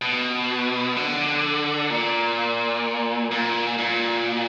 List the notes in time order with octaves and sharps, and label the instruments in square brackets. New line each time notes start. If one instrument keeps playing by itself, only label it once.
[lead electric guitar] B2
D3
A#2
A#2
A#2